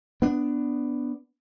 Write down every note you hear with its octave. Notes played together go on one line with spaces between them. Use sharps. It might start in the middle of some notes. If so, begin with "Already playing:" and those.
B3 D4